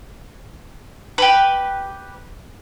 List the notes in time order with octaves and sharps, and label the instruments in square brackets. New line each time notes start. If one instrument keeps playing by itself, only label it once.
[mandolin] G4 B4